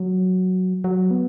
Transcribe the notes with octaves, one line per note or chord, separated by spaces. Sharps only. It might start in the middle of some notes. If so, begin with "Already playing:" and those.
Already playing: F#3
F#3
B3